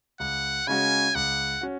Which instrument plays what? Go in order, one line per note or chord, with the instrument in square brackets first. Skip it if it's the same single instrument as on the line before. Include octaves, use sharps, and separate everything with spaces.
[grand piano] C#2 [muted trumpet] F#5
[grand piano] C#3 G#3 C#4 F#4 [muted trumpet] G#5
[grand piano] C#2 [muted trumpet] F#5
[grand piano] C#4 F#4